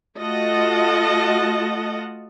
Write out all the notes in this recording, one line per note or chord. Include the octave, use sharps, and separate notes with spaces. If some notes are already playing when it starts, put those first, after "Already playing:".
A3 F4 F#4 D#5 F#5 A5